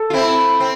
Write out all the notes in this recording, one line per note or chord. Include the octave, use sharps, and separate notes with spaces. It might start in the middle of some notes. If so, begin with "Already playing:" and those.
Already playing: A4
F4
C4 E4
C4